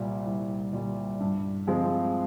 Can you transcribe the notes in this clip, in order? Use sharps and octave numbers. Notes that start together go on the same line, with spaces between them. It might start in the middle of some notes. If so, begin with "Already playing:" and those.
Already playing: C2 A#2 G3
C2
A#2 G3
G2
F3 G#3 C4